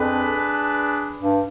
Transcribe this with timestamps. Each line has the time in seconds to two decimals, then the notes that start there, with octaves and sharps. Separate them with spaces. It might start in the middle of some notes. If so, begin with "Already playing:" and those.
Already playing: F2 D4 G#4 B4
1.21 G2